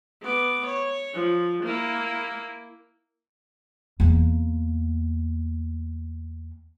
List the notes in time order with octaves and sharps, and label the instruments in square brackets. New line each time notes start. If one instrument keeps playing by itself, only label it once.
[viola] B3 D6
C#5
F3
A#3 E4
[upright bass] E2 A#3